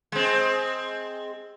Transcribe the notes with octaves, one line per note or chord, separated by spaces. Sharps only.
G#3 C4